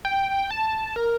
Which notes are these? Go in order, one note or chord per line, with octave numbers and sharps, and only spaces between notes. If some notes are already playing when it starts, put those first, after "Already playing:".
G5
A5
A#4